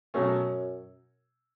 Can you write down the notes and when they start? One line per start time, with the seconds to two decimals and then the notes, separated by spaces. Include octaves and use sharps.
0.14 F#2 B2 F#3 A3 C#4